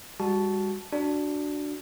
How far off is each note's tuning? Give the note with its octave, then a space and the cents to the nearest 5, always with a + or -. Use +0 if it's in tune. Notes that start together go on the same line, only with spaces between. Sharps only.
G3 +40 F#4 +5 A5 -10
D4 +0 F#4 +0